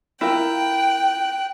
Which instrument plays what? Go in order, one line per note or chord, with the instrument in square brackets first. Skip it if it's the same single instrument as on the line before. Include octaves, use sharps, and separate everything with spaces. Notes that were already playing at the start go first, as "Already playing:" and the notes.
[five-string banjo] E4 F4 A#4 [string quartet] G5 F#6